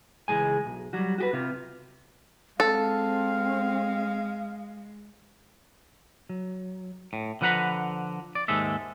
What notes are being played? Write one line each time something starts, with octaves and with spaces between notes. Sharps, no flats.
C#2 B2 E3 G#3 G#5
B1
F#3 G3 F#4
F#4 G4 B4
C3 F4
G#3 C4 A4 F5
F#3
A2
D3 F3 B4 F#5 A#5 B5
D5
D#2 G#2 G#3 A4 E5